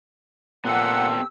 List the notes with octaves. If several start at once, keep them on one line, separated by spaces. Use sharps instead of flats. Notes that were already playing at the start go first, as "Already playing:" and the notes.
A#2 B3 C4 G4 A4 F#5 E6